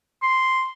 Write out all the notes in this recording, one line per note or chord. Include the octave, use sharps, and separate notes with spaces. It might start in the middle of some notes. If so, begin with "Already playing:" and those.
C6